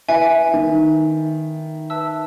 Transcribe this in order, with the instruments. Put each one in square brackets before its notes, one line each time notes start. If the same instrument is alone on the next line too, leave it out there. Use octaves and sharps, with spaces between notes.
[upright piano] E4 [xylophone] B4 E5 G#5
[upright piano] D#3
[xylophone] B4 E5 A5 E6